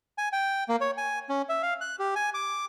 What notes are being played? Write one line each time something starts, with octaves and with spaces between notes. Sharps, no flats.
G#5
G5
A#3
C#5
G#5
C#4
E5
F5
F#6
G4
G#5
D6